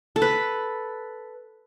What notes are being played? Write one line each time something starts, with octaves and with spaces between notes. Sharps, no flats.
A4
B4